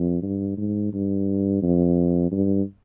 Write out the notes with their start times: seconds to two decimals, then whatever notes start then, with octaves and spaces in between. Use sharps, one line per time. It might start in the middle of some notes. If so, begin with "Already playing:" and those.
Already playing: F2
0.22 G2
0.57 G#2
0.93 G2
1.62 F2
2.32 G2